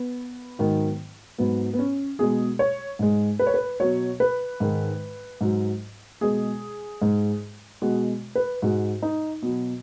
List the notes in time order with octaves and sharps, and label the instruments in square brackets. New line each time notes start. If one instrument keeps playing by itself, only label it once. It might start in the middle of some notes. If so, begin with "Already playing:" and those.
Already playing: [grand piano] B3
G#2 D#3 F#3
G#2 F#3 B3
B3
C#4
B2 G#3 G#4
C#5
G#2 G#3
B4
C#5
B4
B2 F#3 C#5
B4
G#2 D#3 G#3
G#2 F#3
B2 G#3 G#4
G#2 G#3
B2 G#3 F#4
B4
G#2 G#3 F#4
D#4
B2 F#3